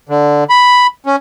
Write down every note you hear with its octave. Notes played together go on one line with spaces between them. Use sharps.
D3
B5
C#4